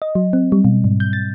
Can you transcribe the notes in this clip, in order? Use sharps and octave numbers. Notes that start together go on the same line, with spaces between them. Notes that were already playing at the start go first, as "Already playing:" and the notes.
D#5
F#3
C4
G3
B2
G#2
G6
A6